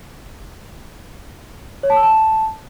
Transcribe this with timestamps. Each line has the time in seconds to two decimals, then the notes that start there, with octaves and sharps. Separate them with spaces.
1.83 C#5
1.90 A5
1.96 E6
2.03 A5